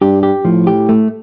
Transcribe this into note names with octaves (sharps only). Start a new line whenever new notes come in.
G2 G4
G4
A2 F3
G4
A3